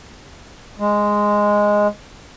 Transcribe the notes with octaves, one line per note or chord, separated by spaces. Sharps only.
G#3